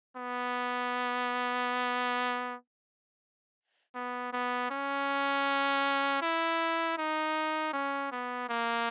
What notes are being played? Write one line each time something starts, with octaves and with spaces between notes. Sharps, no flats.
B3
B3
B3
C#4
E4
D#4
C#4
B3
A#3